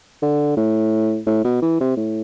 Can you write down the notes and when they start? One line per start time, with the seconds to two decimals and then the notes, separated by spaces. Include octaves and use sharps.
0.22 D3
0.57 A2
1.26 A2
1.44 B2
1.62 E3
1.80 C3
1.97 A2